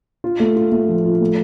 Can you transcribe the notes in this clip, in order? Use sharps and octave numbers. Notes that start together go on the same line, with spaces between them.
F4
A3
F4
A3
F3
F4
A3